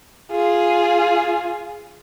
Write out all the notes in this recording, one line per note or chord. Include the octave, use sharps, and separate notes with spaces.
F4 G#4